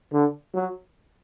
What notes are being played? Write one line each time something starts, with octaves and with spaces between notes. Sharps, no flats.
D3
F#3